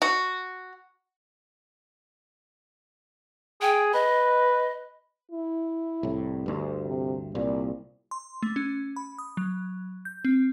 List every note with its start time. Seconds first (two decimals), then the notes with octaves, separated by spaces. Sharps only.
0.02 F#4
3.62 G#4 G5
3.94 B4 D#5
5.31 E4
6.03 C2 A2
6.46 D2 G2
6.85 C3
7.35 C2 A#2 D5
8.11 C6
8.42 A3
8.56 C#4
8.96 B5
9.18 D#6
9.37 F#3
10.05 G6
10.25 C4